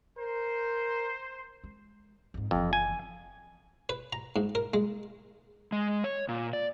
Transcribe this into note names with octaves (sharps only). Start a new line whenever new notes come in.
A#4 C5
G#3
F2 G#2
F#1 F2 E3
G#5
B4
A#5
G#2
A#4
G#3
G#3
C#5
A#2
D5